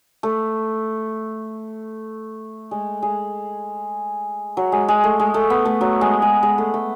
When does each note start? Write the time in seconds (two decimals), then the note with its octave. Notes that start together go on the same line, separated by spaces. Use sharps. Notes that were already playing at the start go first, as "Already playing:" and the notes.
0.23 A3
2.71 G#3
3.02 G#3
4.57 F#3
4.72 G#3
4.88 G#3
5.04 A3
5.20 G#3
5.34 A3
5.50 B3
5.65 A3
5.81 F#3
6.01 G#3
6.22 G#3
6.43 G#3
6.58 A3
6.74 A3